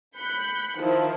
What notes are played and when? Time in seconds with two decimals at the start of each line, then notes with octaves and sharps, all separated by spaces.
0.17 B5 F#6 G6 C#7
0.79 D#3 F3 E4